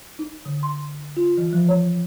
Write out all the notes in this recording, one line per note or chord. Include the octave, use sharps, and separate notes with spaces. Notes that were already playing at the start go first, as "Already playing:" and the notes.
D#4
D3
C6
F4
E3
F3
C#5